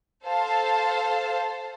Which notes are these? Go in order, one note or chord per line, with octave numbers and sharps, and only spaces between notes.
A4 C5 F5 A5